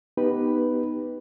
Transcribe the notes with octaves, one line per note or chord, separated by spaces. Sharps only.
B3 D#4 G4 B4